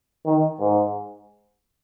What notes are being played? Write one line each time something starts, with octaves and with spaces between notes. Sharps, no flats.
D#3
G#2